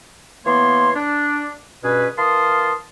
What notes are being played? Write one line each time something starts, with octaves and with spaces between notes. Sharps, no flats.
E3 A#3 B3 C#5 C6
D4
G2 B2 C#4 G#4 B4
E3 A#4 F5 A5 C6 D#6